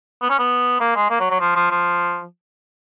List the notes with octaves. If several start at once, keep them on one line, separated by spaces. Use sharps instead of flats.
B3
C#4
B3
A#3
G#3
A#3
F#3
F#3
F3
F3
F3